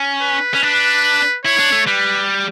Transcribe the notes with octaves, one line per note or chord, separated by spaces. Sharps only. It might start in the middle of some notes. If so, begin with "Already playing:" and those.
Already playing: C#4
B4
C#4
D4 B4
E4 C#5
D4
A3
G3 B4